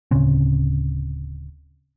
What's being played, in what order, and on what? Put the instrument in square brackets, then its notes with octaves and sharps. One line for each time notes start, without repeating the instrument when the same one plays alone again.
[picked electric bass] D1 C#3 C4 C#4